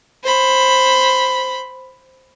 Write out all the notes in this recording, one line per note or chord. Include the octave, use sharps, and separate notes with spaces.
C5 B5